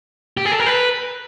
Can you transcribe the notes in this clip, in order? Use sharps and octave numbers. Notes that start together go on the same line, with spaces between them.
G4
G#4
A4
A#4
B4